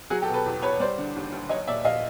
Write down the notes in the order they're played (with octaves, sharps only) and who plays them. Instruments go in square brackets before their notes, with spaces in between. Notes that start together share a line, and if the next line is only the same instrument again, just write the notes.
[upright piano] F#3 F#4 G#4
G4 A4
B2
A4 B4
E2
E2 B4 C#5
G3 C5 D5
D3
D#2
D#2
F#3 C#5 D#5
A#2 D5 E5
A#1 D#5 F5